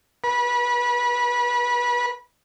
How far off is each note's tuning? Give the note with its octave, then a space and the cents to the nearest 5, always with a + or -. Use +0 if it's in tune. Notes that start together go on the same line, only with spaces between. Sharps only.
B4 -30